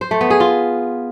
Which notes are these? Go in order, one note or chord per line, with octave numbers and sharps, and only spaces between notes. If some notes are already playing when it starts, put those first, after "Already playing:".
C5
A3
B3
G#4
F4